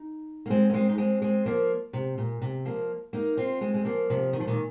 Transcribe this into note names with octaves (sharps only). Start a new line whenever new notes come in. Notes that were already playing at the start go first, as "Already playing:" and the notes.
Already playing: D#4
A#3
G#3 C4
A#3
G#3 C4
D#4
G#3 C4
G#3 C4
F3 A#3
C3
A#2
C3
F3 A#3
A#3 D#4
C4 F4
G#3 C4
G#3
F3 A#3
C3 F3
D#3
F3
A#2 D#3